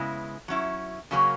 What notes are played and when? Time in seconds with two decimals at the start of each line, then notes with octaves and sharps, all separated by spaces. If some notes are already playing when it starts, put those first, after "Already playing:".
Already playing: C#3 G#3 B3 E4
0.48 F#3 C#4 E4
1.11 C#3 F#3 A#3 C#4